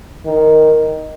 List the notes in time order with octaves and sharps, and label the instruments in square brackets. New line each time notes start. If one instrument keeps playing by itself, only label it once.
[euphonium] D#3